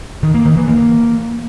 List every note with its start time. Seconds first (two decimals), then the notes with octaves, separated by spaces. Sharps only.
0.23 D#3
0.34 A#3
0.46 D#3
0.57 E3
0.68 A#3